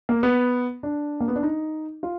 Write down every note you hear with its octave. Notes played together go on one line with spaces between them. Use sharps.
A#3
B3
D4
A#3
B3
D4
D#4
F4